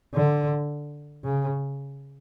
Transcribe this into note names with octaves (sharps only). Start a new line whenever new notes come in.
D3
C#3